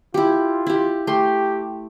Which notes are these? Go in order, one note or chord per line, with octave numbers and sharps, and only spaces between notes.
E4 F4 G4
E4 G4
A3 G4 C6